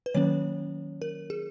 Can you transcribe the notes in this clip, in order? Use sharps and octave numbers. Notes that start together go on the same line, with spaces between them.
B4
D#3 F#3 A#3 C#4 C#5
A#4
G#4